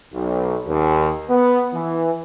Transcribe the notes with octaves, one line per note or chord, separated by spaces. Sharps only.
B1
D#2
B3
E3